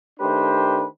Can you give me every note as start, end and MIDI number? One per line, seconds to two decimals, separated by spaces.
0.20 0.84 51
0.20 0.84 57
0.20 0.84 62
0.20 0.84 67
0.20 0.84 71
0.20 0.84 72